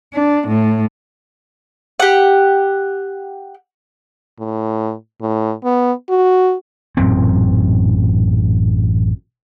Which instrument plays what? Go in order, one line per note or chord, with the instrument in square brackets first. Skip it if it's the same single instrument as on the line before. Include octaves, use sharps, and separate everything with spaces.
[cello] D4
A2
[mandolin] G4 F#5
[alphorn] A2
A2
B3
F#4
[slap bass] A1 F#2 A#2 C4